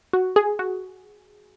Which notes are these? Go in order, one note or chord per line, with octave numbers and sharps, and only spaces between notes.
F#4
G#4
F#4